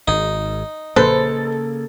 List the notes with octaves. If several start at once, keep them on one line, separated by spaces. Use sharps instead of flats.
G#1 D#4
A#1 C#3 A#3 A4 B4 C5